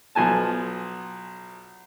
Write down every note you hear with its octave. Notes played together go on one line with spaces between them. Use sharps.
B1 F3 G#5 A5